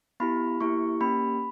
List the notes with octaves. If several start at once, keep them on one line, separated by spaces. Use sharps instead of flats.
B3 E4 G4 B5
A#3 E4 G4 C#6
A#3 C#4 G4 B5